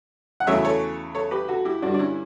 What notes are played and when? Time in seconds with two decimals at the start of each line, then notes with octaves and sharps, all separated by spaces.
0.40 F#5
0.47 E2 C#3 F#3 A3 C#5 E5
0.65 A4 C#5
1.15 A4 C#5
1.31 G4 B4
1.48 F#4 A4
1.65 E4 G4
1.82 G2 D3 G3 D4 F#4
1.94 D4
1.99 C#4 E4